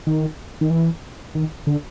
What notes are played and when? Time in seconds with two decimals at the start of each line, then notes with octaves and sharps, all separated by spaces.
0.07 D#3
0.61 D#3
0.70 E3
1.35 D#3
1.67 D3